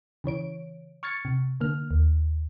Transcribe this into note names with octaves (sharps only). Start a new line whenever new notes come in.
C#3 E3 C#5 D7
C#6 F6 G#6 A6 C#7
C3
D3 A#3 F6
D#2